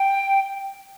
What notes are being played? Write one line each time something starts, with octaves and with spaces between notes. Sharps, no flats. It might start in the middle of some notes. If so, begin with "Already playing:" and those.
Already playing: G5